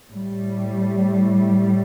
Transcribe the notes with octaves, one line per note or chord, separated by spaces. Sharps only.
A2 G3